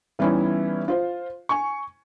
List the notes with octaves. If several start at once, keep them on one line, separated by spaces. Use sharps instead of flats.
E3 G3 B3 C#4 D#4 E4
F4 C5 F5
G#5 C#6